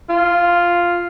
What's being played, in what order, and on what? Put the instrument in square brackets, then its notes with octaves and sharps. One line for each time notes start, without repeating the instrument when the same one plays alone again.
[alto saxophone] F4